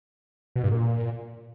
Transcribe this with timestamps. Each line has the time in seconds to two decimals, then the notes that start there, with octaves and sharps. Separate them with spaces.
0.56 B2
0.63 G2
0.71 A#2